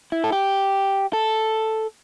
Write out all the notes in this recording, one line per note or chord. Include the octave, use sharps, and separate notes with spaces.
E4
A4
G4
A4